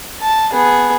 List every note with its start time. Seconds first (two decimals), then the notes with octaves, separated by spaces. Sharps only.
0.21 A5
0.52 B3 G#4